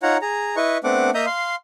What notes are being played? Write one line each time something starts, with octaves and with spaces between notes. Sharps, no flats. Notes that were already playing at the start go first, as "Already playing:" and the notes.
D#4 F4 C#5 F#5 A#5
G#4 A#5
E4 B4 D#5 C#6
A3 B3 C4 D4 F#5 D6
A#3 D#5 E5 A#5 D#6 G6
F5 C6